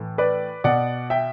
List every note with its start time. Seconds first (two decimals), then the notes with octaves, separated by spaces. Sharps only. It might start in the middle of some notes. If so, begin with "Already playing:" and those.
Already playing: A2 E3
0.18 B4 D5
0.64 B2 D5 F#5
1.10 E5 G5